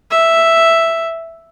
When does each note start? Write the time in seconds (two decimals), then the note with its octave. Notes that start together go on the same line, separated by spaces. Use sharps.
0.11 E5